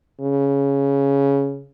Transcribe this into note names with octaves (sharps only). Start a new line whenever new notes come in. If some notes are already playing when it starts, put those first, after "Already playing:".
C#3